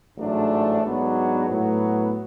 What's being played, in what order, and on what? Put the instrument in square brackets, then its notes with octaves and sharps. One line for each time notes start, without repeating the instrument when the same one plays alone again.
[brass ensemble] A1 G#2 F#3 A3 D4
G#2 F#3 B3 D4
A2 F#3 B3